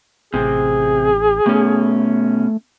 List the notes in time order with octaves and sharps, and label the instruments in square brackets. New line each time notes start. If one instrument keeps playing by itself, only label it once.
[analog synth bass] A1 [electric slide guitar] C3 C4 [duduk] G#4
[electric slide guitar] B2 C#4 [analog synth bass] A3